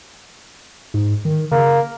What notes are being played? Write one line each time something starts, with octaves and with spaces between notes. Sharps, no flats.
G#2
D#3
C#3 A#3